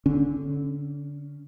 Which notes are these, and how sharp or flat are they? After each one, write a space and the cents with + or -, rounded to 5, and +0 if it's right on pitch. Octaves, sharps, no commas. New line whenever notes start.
D3 -25 C#4 +0